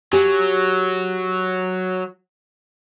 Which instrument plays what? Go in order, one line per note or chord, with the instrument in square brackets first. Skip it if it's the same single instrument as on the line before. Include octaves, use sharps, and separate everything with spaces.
[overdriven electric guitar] F#3 [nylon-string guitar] G4 G#5